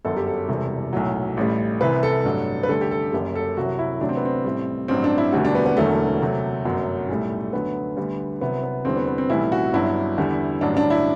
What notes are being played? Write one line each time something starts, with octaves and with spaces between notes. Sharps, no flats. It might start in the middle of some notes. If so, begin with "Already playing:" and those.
G1 F#2 F#3 A4
G4
A4
E1 E2 C3 G3
B1 A2 F#3
A1 A2 G3
C2 C3 E3 B4
A4
A1 G2 F#3
B4
D2 D3 G3 A4
G4
A4
F#1 F#2 F#3 G4
A4
C2 C3 F#3 F#4
E4
D2 C3 F#3 D4
C4
B3
C4
A1 A2 G3
A1 G2 F#3 C4
D4
E4
E1 D2 D3 G3 F#4
D4
B3
B3
E1 E2 D3 F#3 A3
D2 C3 F#3
G1 F#2 F#3
B1 A2 G3
D2 D3 F#3 B3
D2 D3 G3
C2 C3 F#3 B3
B3
E2 D3 G3 C4
B3
B3
C4
B1 A2 E3 G3 E4
F#4
G1 G2 F#3 E4
E2 D3 G3
A1 G2 D3 F#3 D4
D4
E4